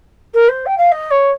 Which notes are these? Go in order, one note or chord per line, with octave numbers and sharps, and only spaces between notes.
A#4
C5
G5
F5
D#5
C#5